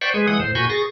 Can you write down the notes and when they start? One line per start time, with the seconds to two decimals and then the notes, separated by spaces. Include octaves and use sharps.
0.01 C5 D5 F#5 G5 B5 C#6
0.14 G#3 G#4 B4
0.28 E3 G#3 F#5 D#6
0.40 A2 C5
0.55 A#2 F#4 G#5 B5 C#6 G6
0.70 G#4 C#6 A6 A#6